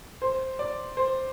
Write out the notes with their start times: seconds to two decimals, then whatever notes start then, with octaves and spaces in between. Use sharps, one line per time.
0.22 C5
0.59 D5
0.97 C5